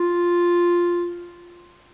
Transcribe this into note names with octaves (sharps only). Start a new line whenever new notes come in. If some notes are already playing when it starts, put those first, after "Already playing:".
Already playing: F4